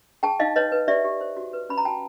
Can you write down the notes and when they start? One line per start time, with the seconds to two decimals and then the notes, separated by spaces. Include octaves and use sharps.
0.23 G#4 G5 A5
0.40 D#4 D#5 F5
0.56 B4 C#5 D#5
0.72 B4
0.88 G4 D5 E5
1.04 G4
1.21 C5
1.37 F#4
1.53 B4
1.69 C#4 B5
1.77 A#5
1.85 F#4 G5 A5